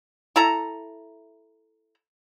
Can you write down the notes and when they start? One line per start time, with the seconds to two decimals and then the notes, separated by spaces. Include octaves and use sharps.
0.36 E4 A4 A#5